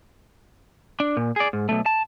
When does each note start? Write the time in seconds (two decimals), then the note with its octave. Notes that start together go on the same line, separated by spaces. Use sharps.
1.00 D4
1.17 A#2
1.36 G#4 D5
1.53 G#2
1.69 B1 A3
1.86 A5